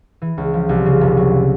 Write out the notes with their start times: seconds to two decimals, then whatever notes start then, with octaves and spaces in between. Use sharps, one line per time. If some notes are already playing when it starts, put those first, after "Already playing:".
0.22 E3
0.38 C#2
0.54 F3
0.69 C2
0.86 C#3
1.01 F1
1.17 F#3